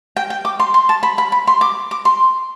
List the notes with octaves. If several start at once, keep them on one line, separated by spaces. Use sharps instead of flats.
G5
G5
D6
C6
C6
A5
B5
B5
B5
C6
D6
D6
C6